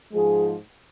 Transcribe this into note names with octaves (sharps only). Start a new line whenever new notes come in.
G#2 F3 G#3 G#4